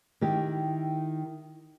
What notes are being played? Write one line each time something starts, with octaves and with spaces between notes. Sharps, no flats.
D#3 E4 G4